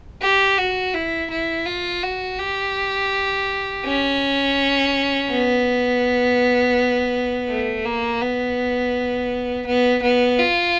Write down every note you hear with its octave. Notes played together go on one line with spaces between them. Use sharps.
G4
F#4
E4
E4
F4
F#4
G4
C#4
B3
A3
A#3
B3
B3
B3
F4